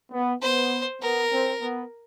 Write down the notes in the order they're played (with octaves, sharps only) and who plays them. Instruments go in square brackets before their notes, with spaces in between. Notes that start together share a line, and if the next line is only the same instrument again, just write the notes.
[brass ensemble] B3
[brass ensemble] B3 [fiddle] C5
[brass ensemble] B3 [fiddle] A#4
[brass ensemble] C4
B3